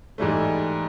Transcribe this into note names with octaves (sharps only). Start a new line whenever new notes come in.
G#2 E3 G3 A3